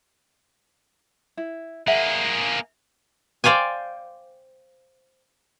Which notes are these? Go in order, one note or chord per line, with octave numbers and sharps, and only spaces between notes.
E4
A#3 G#4 E5 F#5
C5 D5 F5 G5 G#5